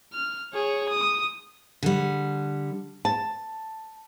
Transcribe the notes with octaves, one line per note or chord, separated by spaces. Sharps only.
F6
G#4 C#5
D#6
D3 G3
A5